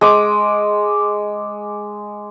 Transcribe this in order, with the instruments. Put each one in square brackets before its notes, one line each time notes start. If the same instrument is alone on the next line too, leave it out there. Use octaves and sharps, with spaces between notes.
[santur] G#3 D6